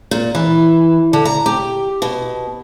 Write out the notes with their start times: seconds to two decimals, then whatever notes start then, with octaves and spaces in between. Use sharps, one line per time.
0.11 A#2
0.35 E3
1.13 D3
1.25 A#5
1.46 G4
2.02 B2